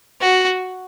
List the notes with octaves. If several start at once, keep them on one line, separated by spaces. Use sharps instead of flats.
F#4